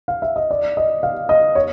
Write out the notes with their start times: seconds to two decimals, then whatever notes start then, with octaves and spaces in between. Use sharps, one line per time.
0.08 F5
0.22 E5
0.36 D#5
0.51 D5
0.77 D#5
1.03 F5
1.29 D#5
1.55 C#5